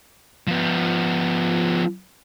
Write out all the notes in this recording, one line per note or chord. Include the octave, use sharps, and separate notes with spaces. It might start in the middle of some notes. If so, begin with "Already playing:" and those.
F3 B3